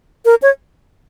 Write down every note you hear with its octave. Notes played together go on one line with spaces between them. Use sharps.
A#4
C#5